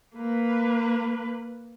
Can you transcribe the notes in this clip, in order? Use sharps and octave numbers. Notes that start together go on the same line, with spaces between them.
A#3 B4